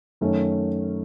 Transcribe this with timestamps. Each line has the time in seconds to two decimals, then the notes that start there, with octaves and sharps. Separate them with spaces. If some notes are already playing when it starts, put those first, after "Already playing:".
0.21 F#2 D#3 A3 C#4